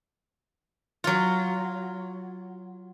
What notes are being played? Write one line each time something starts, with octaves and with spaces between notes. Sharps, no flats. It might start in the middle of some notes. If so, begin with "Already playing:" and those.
F#3 F4